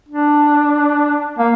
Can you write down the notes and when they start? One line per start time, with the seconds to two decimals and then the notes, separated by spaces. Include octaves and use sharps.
0.08 D4
1.38 A#3